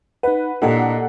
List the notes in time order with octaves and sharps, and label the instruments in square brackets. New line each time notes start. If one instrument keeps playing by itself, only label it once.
[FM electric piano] D#4 F#5 [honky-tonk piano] B4
[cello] A#2 [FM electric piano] D4 E4 D#5 [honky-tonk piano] G4 A4 F#5